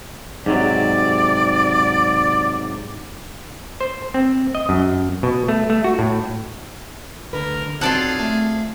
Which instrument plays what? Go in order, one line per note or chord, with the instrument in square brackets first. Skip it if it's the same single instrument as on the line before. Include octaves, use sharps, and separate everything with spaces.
[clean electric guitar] G#2 C3 F#3 [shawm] D5
[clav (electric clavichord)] C5
C4
D#5
F#2
B2
A3
A3
F#4
A2
[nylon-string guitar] D2 D3 B4 [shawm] A#4
[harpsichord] B1 A4 A5 [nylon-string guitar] C4 [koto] F4 D5 F#5 [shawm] G#4
[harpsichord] A3